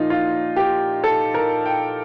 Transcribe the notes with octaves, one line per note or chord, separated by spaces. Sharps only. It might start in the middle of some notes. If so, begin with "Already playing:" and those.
Already playing: A#2 F3 D#4 F4
F4
G4
A4
A#4
G5